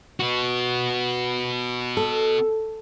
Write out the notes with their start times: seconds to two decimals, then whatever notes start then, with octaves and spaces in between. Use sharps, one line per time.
0.20 B3 F#4
1.97 A4